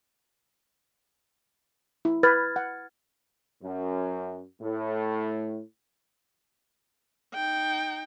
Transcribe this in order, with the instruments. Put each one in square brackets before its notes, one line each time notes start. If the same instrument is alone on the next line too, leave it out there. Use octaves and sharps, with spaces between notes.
[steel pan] E4
[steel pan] B4 [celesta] F6 G#6 A6
[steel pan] F#5
[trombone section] F#2
A2
[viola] D#4 G5